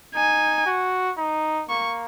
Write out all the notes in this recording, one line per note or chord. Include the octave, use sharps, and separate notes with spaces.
D#4 G#5
F#4
D#4
A#3 C#6